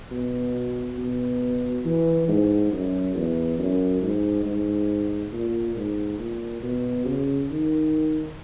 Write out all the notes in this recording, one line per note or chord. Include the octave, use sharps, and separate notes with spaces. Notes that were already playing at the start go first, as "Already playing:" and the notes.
B2
B2
E3
G#2
F#2
E2
F#2
G#2
G#2
A#2
G#2
A#2
B2
C#3
D#3